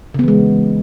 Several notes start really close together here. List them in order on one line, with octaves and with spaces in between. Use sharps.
C#3 B3 E3 G#3